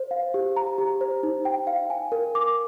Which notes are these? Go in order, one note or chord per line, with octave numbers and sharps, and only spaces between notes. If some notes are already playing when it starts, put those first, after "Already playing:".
Already playing: C5
F5
G4
A#5
G4
C5
D#4
G5
F5
G#5
A#4
D6